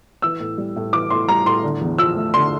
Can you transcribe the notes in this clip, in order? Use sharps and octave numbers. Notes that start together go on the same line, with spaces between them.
E3 E6
A2
G3
A2
E3 D6
A2 C6
G3 A#5
A2 C6
D3
E2
F3 E6
A3
D3 C6